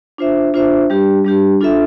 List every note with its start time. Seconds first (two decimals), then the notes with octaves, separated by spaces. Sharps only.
0.18 D4 F4 C5 E5
0.54 D4 F4 C5 E5
0.90 G3 D4 G4
1.24 G3 D4 G4
1.61 D4 F4 A4 E5